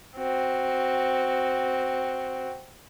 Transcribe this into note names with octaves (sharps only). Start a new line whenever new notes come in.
C4 F#4